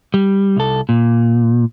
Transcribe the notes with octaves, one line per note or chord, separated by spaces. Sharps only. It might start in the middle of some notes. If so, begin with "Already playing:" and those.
G3
C2 A4
A#2